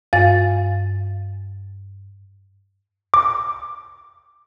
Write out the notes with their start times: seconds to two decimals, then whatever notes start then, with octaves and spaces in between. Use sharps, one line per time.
0.13 G2 F5 A6
3.14 D6